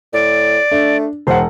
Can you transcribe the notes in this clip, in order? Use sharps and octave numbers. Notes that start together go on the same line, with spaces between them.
A2 D5
A3 D4
E1 C5 F#5